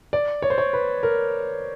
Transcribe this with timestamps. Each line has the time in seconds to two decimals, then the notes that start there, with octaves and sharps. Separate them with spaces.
0.13 D5
0.42 C#5
0.50 C5
0.58 C#5
0.73 B4
1.03 A#4